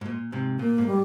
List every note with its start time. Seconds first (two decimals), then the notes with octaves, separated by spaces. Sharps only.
0.01 G#2
0.06 A#2
0.32 G#2 C3
0.59 A#2 A#3
0.78 G#2
0.87 G3